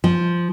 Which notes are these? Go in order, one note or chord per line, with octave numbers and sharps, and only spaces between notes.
F3